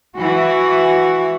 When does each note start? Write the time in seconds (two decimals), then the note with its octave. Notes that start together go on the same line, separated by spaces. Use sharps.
0.16 E3 F#4